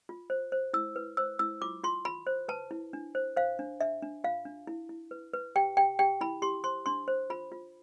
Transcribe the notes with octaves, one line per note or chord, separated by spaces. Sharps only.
F4
C5
C5
E4 E6
B4
C5 E6
E4 E6
F4 D6
F4 C6
F4 B5
C5
B4 A5
E4
D4
C5
C5 F5
D4
D4 E5
D4
F4 F5
D4
E4
E4
B4
B4
G4 G5
G4 G5
G4 G5
E4 B5
G4 C6
C5 C6
D4 C6
C5
F4 B5
F4